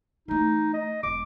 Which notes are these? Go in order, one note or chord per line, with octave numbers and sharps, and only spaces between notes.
E3 A3 D#4
D#5
E1 D6